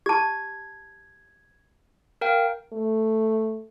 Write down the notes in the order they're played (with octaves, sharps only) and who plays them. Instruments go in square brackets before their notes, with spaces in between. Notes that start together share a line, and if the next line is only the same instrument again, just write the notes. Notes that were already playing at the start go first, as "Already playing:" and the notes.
[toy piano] G4 A5 [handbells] G#6
[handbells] A#4 F5 G5
[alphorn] A3